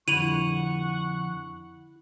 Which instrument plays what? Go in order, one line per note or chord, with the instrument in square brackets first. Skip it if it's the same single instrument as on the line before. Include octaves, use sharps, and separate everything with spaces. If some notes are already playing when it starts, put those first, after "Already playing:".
[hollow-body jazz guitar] F2 D3 [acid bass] E4 [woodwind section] F#5 C#6 [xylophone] D#7 F7 F#7